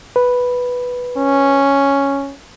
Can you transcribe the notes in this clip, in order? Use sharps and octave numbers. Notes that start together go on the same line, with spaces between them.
B4
C#4